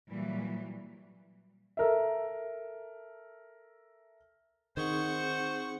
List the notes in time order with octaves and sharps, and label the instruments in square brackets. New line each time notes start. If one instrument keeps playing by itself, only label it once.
[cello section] A#2 E3 F#3 G3
[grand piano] A4 A#4 E5
[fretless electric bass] D#3 [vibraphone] C4 D#4 G#4 [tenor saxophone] C5 [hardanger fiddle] F#5 C#6